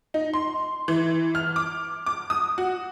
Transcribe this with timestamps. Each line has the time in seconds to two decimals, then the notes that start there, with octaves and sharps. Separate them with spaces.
0.14 D#4
0.33 C6
0.88 E3
1.35 F6
1.56 D6
2.06 D6
2.30 D#6
2.58 F#4